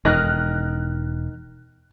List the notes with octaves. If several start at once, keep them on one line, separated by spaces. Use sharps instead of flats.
E1 D#3 D#4 F6 F#6 A#6